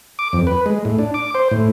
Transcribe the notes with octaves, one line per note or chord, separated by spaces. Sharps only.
D6
F2
B4
G#3
A2
D4
D6
C5
A2